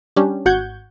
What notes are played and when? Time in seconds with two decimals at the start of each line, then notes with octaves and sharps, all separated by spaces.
0.16 G3 C#4 D4 G4
0.45 G#1 F#4 F#5 G6 G#6